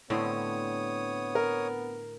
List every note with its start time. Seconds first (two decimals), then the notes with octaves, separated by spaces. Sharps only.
0.10 A2 D3 B3 C4 C#5 D#6
1.35 A#4